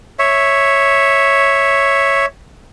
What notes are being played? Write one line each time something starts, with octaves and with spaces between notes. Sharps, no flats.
C#5 E5